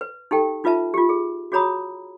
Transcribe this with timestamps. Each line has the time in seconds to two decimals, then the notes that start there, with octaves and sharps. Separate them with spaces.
0.01 B4
0.31 D#4 G4 A4 G5
0.64 D#4 F4 B4 E5 A5
0.94 F4 G4
1.09 G#4
1.52 F#4 G#4 C#5 A#5 B5 D#6